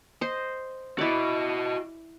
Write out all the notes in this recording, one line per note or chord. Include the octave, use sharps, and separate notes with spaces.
C5 D#5
E4 F#4 D5 D#5